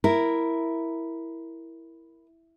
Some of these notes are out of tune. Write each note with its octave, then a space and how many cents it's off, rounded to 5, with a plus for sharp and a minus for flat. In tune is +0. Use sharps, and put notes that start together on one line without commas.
E4 +0 A#4 +0